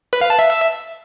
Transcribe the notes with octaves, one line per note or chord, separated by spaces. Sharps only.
B4
F5
A5
E5